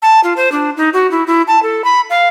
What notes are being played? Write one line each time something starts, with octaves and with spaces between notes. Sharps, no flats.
A5
F4
C5
D4
D#4
F#4
E4
E4
A5
A4
B5
F5